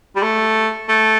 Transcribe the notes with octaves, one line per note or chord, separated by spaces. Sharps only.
G3
A3
A3